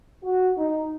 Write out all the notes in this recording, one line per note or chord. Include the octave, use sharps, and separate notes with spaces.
F#4
D#4